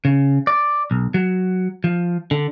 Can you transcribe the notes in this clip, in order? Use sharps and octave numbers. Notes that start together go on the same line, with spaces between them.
C#3
D5
B1
F#3
F3
D3